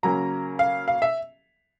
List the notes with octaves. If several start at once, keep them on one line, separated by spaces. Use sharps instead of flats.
C#3 F#3 A#3 C#4 A#5
F5
F5
E5